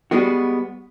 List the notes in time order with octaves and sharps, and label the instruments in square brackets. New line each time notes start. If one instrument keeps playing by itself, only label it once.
[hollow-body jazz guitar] G3 G#3 B3 F#4